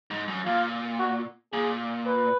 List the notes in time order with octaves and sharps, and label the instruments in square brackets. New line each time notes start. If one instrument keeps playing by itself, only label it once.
[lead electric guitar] G#2
F#2
[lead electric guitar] A#2 [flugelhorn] F4
[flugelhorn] F#4
[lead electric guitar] A#2 [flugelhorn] G#4
[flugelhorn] B4